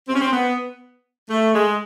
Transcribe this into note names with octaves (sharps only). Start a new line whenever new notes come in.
C4
C#4
C4
B3
A3
G#3